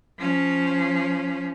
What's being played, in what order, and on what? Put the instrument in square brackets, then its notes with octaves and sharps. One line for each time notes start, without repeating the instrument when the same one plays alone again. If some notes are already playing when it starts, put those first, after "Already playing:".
[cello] F3 C#4